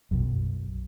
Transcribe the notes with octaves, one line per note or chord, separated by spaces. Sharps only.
B1 F#2